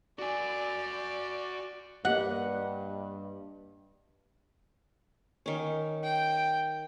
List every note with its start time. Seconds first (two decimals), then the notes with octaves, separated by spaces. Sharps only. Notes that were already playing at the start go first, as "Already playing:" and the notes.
0.19 F#4 D5 G#5
2.05 G2 A#3 G4 D#5 F#5
5.46 D#3 C#4
6.03 G5